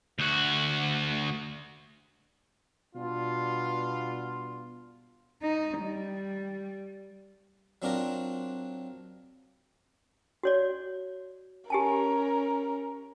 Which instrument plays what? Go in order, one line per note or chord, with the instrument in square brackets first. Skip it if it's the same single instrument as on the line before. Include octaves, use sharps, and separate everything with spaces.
[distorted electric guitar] D2 F#4
[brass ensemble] B2 G3 B3 D4 F4
[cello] D#4
G3
[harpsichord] F#3 C4 D4 F4 A#4
[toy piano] F#4 C#5 D5
[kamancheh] C#4 A#4 [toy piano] G4 G#5 A5